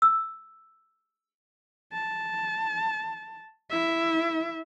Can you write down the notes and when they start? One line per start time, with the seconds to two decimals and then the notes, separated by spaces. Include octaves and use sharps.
0.02 E6
1.93 A5
3.71 E4 E5